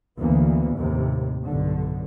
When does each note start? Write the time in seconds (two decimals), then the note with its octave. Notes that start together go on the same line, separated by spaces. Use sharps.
0.20 D2 E3 A#3 B3
0.77 D#2 A2 C3
1.46 B1 G2 D3